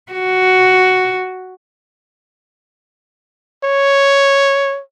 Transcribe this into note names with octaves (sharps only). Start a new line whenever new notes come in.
F#4
C#5